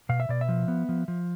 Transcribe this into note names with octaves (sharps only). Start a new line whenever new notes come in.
B2 F5
E5
B2 D5
E5
F3
B3
F3
F3